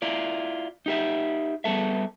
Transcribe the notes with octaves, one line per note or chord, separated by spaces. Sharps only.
E4 F4 D5
D#4 G4 E5
G3 G#3 B3 A4 E5